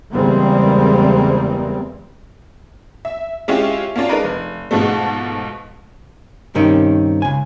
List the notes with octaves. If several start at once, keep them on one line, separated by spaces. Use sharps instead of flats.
E2 C#3 G3 G#3 A#3 C4
E5
G#3 C#4 E4 F4 G4
A#3 C#4 D4 F4
G#3 D4 D#4 A#4 B4
F1
G#2 B2 F3 G#3 A3
G2 C3 D#3 C4 C#4 D#4
C#2 G#5